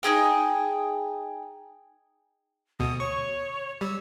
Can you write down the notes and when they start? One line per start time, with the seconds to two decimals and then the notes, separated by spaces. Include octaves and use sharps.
0.03 D#4 G4 G#4 G5
2.80 D2 B2 D#6
3.00 C#5 C#6
3.81 G3 E6